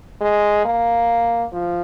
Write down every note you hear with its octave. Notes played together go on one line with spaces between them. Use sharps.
G#3
A#3
F3